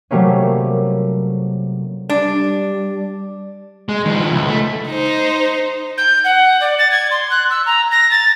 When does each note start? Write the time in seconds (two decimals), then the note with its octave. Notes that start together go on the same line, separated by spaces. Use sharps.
0.11 C3 F#3 G3 A3 A#3 C#4
2.10 G3 D4
3.89 G#3
4.05 D#3 F3
4.32 C#2
4.49 A3
4.88 D#4 C5
5.98 G6
6.24 F#5
6.61 D5
6.79 A6
6.91 G#6
7.11 C6
7.31 F#6
7.50 E6
7.66 A#5
7.91 A#6
8.11 A6